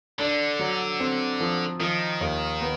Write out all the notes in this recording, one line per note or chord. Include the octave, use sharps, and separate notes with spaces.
D3 D4
F#3
C4
F3
D#3 F3
D#2
B3